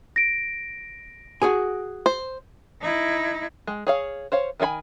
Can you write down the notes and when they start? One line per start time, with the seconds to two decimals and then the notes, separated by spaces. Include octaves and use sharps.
0.16 A#6 D7
1.42 F#4 G#4 G#5
2.06 C5
2.82 D#4 E4
3.67 G#3
3.87 G#4 C#5 F5
4.32 C5 C#5 F5
4.60 D#3 C#4 F4 G#5 B5